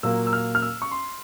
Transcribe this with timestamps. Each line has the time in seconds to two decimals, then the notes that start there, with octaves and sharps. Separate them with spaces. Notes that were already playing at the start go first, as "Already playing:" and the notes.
0.03 A#2 F#3 A#3 E6
0.27 E6
0.33 F6
0.55 F6
0.62 E6
0.82 C#6
0.91 C6